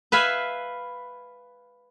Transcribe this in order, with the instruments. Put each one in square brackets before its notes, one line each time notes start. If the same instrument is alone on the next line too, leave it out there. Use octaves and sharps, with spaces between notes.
[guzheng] B4 E5 F5 G#5 B5